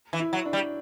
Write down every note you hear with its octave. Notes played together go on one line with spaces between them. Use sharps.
E3
E4
F#3
D4
G3